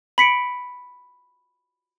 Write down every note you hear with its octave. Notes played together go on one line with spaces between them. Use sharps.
B5 B6 C#7 D7